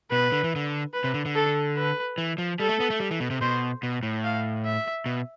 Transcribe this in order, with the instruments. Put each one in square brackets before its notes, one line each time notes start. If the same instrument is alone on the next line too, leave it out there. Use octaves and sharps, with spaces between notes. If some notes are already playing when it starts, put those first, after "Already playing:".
[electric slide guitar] B2 [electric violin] B4
[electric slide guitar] D3
E3
D3
[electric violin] B4
[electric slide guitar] C3
D3
D3
[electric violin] A4
B4
[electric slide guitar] E3
F3
[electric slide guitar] G3 [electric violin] A4
[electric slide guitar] A3
B3
A3
G3
E3
B2
C3
[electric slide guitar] B2 [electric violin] C5
[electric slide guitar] B2
A2
[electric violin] F5
E5
[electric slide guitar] B2